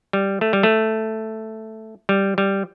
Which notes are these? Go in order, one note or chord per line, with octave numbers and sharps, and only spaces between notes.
G3
A3
G3
A3
G3
G3